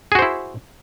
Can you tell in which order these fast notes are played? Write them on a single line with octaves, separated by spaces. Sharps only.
G#4 F#4 C5 E4